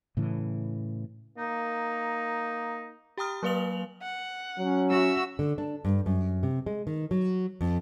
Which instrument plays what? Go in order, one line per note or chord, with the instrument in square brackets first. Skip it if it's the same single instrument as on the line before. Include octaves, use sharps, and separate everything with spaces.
[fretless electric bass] A2 C#3 E3
[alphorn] A#3 [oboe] D#4
[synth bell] G4 G5 A#5 D#6 F6
F#3 A#3 B4 F5 F7 F#7
[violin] F#5
[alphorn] F#3 [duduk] C#4
[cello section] F#4 [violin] E5 E6
[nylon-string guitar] D3
D4
G2
F#2
C3
G#3
D#3
F#3
F2